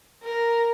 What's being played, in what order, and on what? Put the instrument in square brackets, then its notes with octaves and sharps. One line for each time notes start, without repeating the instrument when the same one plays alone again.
[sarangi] A#4